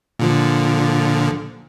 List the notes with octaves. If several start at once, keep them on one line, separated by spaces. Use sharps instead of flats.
A#2 D3 F3